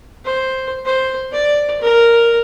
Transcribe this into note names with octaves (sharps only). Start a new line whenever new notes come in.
C5
C5
D5
A#4